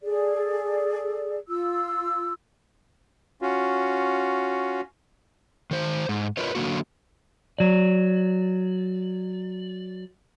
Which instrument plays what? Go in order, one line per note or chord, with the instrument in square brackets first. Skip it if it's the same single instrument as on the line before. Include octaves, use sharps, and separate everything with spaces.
[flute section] G#4 A4 D5
F4 E6
[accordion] C#4 F4 F#4
[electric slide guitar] D#3 C5
G#2
F4 A#4 B4 C#5 D#5
D3 F#3 A#3 F#4
F#3 D5